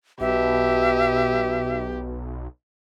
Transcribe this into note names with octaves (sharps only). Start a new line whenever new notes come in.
B1 B2 G4 E5